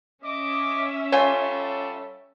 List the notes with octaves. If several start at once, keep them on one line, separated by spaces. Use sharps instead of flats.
C#4 D#5 E5 D6
G3 F4 A4 C#5 G#5